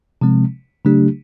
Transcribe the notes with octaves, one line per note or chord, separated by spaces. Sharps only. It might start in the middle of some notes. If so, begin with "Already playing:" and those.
C3 F3 G#3 C4
C#3 F#3 A3 D4 G4